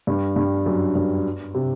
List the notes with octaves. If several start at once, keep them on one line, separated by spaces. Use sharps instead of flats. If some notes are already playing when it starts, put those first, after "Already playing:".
G2
G2
F#2
G2
C3